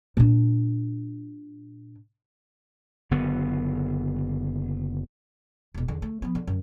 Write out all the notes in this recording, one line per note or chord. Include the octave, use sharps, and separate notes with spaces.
A#2 D4
F#1 D3 B3
E1 B2
E2 D3
A3
F3 B3
D3
F#2